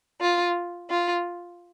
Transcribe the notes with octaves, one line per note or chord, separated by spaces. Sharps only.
F4
F4